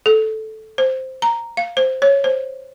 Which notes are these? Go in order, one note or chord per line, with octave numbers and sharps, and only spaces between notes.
A4
C5
A#5
F5
C5
C#5
C5